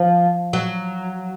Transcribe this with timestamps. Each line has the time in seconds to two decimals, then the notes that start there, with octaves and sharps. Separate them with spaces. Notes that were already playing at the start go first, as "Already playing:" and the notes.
Already playing: F3
0.53 F#3